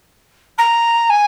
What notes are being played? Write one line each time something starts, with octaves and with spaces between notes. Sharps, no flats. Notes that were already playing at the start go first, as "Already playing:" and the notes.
A#5
G#5